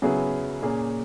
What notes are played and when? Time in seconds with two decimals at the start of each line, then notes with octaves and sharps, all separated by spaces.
0.02 C#3 F#3 B3 E4 G#4
0.62 A#2 A#3 C#4 G#4